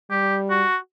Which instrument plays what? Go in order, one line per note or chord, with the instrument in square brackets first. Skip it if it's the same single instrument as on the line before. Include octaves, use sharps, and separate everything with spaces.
[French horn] G3 [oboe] G4
[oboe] F#4